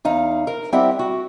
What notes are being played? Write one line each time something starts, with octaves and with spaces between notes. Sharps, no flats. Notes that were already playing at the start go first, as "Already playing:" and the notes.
E2 D#4 F5
A#4
G3 C4 E4 G4 E5 F#5
F#4